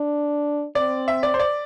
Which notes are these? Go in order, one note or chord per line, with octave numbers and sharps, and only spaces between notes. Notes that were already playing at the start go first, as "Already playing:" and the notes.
Already playing: D4
C4 D5
E5
D5
C5
D5